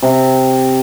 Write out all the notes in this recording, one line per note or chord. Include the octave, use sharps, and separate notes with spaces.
C3